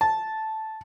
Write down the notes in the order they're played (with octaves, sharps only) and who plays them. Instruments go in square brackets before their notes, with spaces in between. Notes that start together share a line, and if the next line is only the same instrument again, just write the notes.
[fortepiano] A5